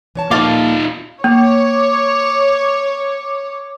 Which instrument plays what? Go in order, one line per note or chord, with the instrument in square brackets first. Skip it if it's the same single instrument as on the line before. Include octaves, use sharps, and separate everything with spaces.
[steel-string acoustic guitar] E3 C#5 A5
[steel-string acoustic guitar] A#2 F3 A#3 [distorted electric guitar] D#4 F4 [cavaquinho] A4 F5 D6
[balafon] A#3 [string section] C#5 [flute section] D6